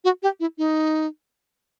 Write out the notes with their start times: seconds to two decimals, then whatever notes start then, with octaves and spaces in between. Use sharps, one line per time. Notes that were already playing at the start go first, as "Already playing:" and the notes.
0.04 F#4
0.23 G4
0.40 E4
0.58 D#4